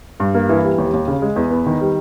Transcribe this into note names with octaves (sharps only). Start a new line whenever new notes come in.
G2
A#3
E3
G3
D#2
D#2
C#3
G#3
E2
B3
D#3
G3